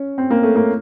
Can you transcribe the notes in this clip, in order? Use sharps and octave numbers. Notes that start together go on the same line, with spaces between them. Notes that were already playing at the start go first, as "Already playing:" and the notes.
Already playing: C#4
C4
A#3
A3
A#3